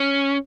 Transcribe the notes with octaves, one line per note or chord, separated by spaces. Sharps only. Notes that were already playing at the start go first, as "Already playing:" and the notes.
Already playing: C#4